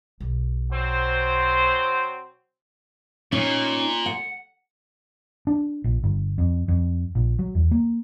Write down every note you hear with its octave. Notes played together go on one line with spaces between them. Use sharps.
B1
F#3 C4 C5
A#2 C#4 D#4
F#5
D4
A#1
G1
F2
F2
A#1
F#3
E2
A#3